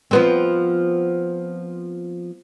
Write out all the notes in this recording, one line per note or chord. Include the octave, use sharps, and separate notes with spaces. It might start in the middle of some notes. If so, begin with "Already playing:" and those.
F3 B3 C4